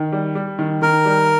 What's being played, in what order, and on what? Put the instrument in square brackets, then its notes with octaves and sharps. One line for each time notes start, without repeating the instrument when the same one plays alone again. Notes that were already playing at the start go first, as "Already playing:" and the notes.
Already playing: [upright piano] D#3
G3
G3
D#3
[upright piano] D#3 [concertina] A#4
[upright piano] G3